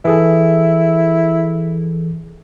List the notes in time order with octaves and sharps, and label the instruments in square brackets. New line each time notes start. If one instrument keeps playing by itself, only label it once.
[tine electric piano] E3 G#4 A4 [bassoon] E4